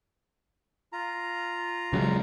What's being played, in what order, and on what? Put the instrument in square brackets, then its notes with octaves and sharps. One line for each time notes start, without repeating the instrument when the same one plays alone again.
[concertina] F4 A#5
[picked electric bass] C#3 F#3 G#3